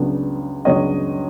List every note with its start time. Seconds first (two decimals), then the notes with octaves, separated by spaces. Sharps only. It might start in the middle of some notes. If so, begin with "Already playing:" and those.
Already playing: C#2 C#3 F#3 B3 D4
0.65 C#2 C#3 F#3 B3 D4 C#5 D#5